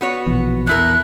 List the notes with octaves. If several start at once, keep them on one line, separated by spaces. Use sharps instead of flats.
B3 F#4 C#5
A#1 B2 E3
E2 B2 E4 A#4 F#6